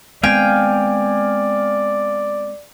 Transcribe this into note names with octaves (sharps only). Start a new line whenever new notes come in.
G#3 B3 C4 D5 F5 G5 G#5